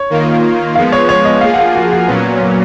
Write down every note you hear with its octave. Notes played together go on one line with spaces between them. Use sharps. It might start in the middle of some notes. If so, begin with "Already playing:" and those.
Already playing: C#5
D#3 A#3 F4
F3 G#3 B3 F5
C#5
C#5
D#5
F3 A#3 F4 G#4 F5
F#5
F5
F#4
F#4
A#2 F#3 B3 C#4
A#3